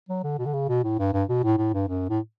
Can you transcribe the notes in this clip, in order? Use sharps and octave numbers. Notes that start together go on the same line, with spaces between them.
F#3
D3
B2
D3
C#3
B2
A2
G2
G2
B2
A2
A2
G2
F#2
A2